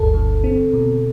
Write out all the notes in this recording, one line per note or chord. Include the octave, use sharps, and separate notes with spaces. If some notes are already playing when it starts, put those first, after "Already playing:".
Already playing: G1 D2 G2 A4
D3
C4
B2